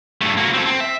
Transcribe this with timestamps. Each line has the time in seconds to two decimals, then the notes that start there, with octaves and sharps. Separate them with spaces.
0.21 G2 A3
0.37 A#3 F#4
0.54 C4 A4
0.66 C4
0.80 E5